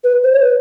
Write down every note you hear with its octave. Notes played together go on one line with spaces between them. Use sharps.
B4
C5
C#5
B4